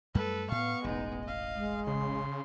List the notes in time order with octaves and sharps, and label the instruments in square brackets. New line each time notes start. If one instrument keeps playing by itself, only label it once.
[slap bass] F#2 G3 A3 [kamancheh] A4 B4
[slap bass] A2 [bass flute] B3 [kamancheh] F5 C#6
[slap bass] E1 A1 [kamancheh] G#3 D#4
[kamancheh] D#5 F5
[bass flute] G#3
[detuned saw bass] C#3 [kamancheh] C6